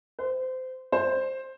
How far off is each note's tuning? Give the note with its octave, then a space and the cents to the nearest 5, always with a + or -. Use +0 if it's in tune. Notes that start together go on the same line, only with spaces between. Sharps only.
C5 -25
C5 +10